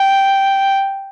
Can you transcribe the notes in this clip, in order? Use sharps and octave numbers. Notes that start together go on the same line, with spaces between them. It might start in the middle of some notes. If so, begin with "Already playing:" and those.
Already playing: G5